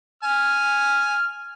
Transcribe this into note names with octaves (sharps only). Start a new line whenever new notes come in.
G#5 F6